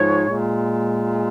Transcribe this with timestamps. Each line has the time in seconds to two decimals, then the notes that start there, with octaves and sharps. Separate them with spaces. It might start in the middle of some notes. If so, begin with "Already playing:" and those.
Already playing: G#2 F3 C#5
0.26 A#2 G#3